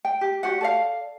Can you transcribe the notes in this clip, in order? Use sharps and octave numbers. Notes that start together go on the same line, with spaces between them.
G5
G4
F#4 G4 D5 F#5
A4 D5 F5